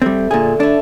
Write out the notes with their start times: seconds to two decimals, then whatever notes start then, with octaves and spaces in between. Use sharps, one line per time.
0.02 G3 A3 C4
0.31 A#2 D3 G#4
0.60 A3 D4 E4